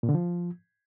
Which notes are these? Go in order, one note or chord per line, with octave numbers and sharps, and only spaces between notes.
A#2
D3
F3